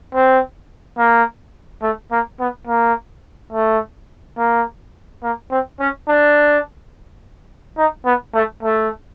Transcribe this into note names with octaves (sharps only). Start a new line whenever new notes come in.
C4
A#3
A3
A#3
B3
A#3
A3
A#3
A#3
C4
C#4
D4
D#4
B3
A3
A3